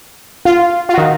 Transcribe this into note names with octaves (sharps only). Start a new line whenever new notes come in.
F4
F4
D#3 F#4